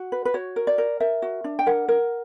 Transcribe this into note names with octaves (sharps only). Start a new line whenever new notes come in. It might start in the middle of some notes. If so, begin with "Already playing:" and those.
Already playing: F#4
B4
B4
F#4 C#5
A#4
D5
A#4
A#4 E5
F#4
D4
G5
A#4 F#5
A#4